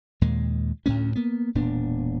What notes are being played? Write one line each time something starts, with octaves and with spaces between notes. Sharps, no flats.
D#2 A#2 G#3
D2 A2 B3 C#4
A#3 B3
E1 A#2 B3 D4